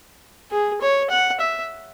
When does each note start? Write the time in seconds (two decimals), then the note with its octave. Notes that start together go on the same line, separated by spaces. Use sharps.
0.51 G#4
0.81 C#5
1.10 F#5
1.40 E5